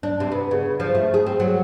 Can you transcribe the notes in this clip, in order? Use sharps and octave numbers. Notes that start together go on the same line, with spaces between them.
D4
C3
B3
C#3
F3
A3
G#4
C4
F#3